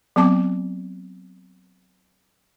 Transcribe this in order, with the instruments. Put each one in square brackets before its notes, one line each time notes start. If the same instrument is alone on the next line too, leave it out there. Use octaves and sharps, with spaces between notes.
[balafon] F#3 B3 C4 A5 D6